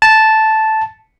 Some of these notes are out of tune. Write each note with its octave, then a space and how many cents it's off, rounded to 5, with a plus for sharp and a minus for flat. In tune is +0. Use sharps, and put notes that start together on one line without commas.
A5 -5